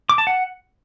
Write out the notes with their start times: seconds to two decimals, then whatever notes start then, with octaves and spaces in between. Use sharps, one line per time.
0.09 D6
0.18 A5
0.27 F#5